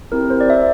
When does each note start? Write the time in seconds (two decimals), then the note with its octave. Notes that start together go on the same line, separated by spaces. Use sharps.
0.12 C4 E4 G4 A#4
0.30 C5
0.41 D5
0.50 E5